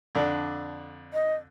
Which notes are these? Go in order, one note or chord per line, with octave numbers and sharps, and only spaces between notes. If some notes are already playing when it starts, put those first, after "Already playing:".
F2 D3 D4
D#5